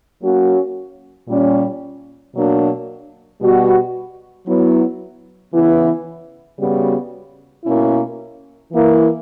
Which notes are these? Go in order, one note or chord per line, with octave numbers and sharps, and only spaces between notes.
F#3 A#3 C#4 F#4
A#2 G3 C#4
B2 F#3 A#3 D4
B2 G3 B3 F#4
F#3 B3 E4
C#3 E3 B3 E4
C#3 G3 B3 F#4
B2 A#3 C#4 E4
E3 A#3 E4